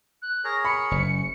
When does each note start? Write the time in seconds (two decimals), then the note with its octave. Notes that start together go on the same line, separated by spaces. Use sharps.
0.22 F#6
0.44 G#4 A#4 C#5 A#6
0.65 B5 C#7
0.91 F#1
1.09 C#4